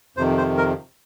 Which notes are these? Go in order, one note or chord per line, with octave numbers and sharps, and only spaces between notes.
F2 C3 D#3 C5
C5
A#4